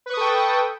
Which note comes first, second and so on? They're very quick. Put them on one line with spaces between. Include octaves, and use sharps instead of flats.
B4 C#6 D#6 A4 G5